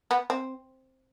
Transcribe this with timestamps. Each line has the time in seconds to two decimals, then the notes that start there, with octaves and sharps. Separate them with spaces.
0.11 B3
0.30 C4